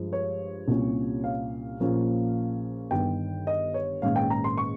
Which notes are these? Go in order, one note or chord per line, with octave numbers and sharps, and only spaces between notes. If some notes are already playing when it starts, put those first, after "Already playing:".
Already playing: G2 F3 G#3
C#5
C2 A#2 G3 C#4
F5
A#1 A#2 F3 A#3 C#4
G1 G2 D#3 G5
D#5
C#5
A#1 G#2 D#3 G#3 C#4 F5
G5
A#5
C6
C#6